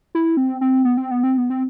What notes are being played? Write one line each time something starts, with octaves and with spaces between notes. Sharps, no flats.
E4
C4
C4
B3
C4
B3
C4
B3
C4